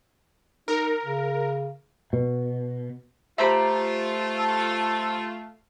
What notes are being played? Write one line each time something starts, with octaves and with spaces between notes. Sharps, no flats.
D#4 A#4
C#3
B2
A3 F4 G4 C5 E5 A#5 B5
A4